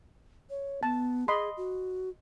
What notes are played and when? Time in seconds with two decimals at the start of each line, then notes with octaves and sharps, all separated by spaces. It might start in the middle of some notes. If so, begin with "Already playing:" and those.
0.50 C#5
0.83 B3 A5
1.28 G#4 D#5 B5 C6
1.57 F#4